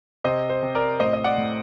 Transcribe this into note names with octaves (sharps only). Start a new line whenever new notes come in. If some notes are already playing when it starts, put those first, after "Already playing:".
C3 C5 D#5
C5
C3
A#4 D5
A2 C5 D#5
D#5
D5 F#5
A2